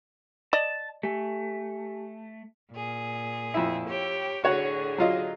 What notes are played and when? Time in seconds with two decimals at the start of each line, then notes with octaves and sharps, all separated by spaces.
0.53 D5 D#5 A5
1.03 A3 G4 G#5
2.72 A#2 G#4
3.54 F2 E4
3.86 G4 C#5 G5
4.44 A2 D3 F#4 G#4 C#5 F#5
4.98 F#3 F4 D#5